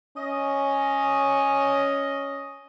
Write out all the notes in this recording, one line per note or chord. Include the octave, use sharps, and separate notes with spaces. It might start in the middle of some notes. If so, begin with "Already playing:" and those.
C#4 D#5